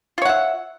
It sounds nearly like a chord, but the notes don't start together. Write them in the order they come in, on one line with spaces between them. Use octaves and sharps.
F4 C#5 F#5 E5